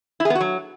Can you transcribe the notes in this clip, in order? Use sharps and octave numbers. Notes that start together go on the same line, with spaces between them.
E4
G#4
B3
F#4
F#3